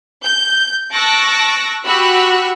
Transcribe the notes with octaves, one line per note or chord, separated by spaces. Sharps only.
G6
A5 C#6 E6 F#6 A#6 D7
F#4 G4 B5 E6 F#6